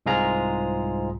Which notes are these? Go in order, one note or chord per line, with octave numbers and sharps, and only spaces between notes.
C2 G#2 G#3 F4 G#4 A#5